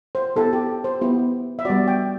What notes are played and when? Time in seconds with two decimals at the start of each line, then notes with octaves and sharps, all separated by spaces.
0.15 C5
0.36 B3 E4 G4 A4
0.53 G4
0.84 C5
1.01 B3 E4 G4
1.59 E5
1.65 G3 B3 F#4 D5
1.88 G5